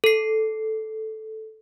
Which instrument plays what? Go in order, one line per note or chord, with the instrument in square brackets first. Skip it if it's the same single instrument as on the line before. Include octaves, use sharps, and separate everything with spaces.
[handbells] A4 C7